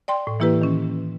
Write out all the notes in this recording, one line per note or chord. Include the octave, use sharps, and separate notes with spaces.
D5 G5 C6
A2
E3 A#3 E4 G4 B4
D#3 C#4